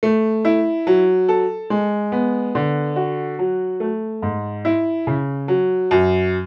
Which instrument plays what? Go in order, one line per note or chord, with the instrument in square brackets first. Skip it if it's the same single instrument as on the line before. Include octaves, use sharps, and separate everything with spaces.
[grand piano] A3
E4
F#3
A4
G#3
B3
D3
F#4
F#3
A3
G#2
E4
C#3
F#3
F#2